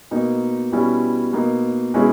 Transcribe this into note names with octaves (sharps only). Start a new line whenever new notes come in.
B2 A#3 D#4
B2 G3 C#4 E4
B2 A#3 D#4
B2 G#3 C#4 E4